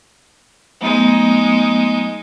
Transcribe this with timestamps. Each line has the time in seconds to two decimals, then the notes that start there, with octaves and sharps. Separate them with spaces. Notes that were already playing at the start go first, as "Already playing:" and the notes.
0.81 F#3 G#3 A3 B3 D#4